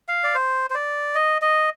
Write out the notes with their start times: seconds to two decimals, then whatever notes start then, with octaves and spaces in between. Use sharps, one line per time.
0.09 F5
0.24 D5
0.35 C5
0.70 C5
0.75 D5
1.15 D#5
1.42 D#5